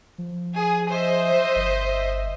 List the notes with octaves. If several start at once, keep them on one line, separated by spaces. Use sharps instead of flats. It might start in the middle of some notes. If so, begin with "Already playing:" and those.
F3
G#4
C5 D#5 E5
G1